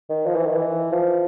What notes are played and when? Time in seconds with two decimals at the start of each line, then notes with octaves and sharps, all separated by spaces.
0.09 D#3
0.26 F3
0.36 E3
0.47 D#3
0.57 E3
0.92 F3